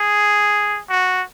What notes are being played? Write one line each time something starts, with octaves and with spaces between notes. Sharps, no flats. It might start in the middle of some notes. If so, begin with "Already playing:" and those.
Already playing: G#4
F#4